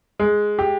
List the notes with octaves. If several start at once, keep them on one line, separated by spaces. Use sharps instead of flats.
G#3
G4